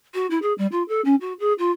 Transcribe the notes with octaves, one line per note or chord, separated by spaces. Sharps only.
F#4
E4
G#4
G3
F4
A4
C#4
F#4
G#4
F4